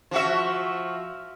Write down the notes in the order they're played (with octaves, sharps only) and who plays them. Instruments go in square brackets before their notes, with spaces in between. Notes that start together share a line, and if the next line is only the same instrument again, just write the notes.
[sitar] F3 F#4 E5